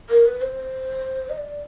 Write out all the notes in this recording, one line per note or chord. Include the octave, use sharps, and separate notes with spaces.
A#4
B4
C5
D#5
D5